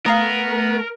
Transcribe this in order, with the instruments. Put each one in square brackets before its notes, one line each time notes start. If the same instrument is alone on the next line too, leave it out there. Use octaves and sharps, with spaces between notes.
[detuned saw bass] A3 [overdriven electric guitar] B3 [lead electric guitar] A#4 [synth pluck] F5 A#5 D#6